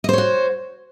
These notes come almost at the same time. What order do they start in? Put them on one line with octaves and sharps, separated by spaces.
D#5 C5 C#5 F#4